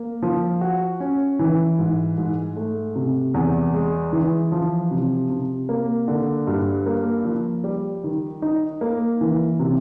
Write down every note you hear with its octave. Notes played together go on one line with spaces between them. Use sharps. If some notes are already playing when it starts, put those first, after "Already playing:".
Already playing: A#3
F3
F#4
C#4
E3
G#2
G#2
A3
C3
E2
G#3
E3
F3
C3
C3
A#3
D3
G2
A#3
F3
G3
D#3
D#4
A#3
E3
C3